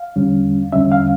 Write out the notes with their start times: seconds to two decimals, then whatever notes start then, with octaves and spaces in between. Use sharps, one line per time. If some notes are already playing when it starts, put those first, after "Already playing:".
Already playing: F5
0.16 E2 D3 G3 C#4
0.72 E2 D3 G3 C#4 E5
0.92 F5